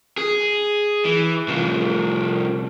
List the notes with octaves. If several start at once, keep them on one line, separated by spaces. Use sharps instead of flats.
G#4
E3
C2 F3